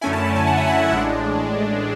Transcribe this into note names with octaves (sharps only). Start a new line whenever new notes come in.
F#2 D3 A3 C#4 E4 G#5
A5
A5
G#5
F#5
E5
F#5
A1 A2 G#3 D4